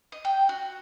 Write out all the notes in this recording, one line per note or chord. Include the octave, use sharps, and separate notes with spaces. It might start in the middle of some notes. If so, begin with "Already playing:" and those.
D#5
G5
F#4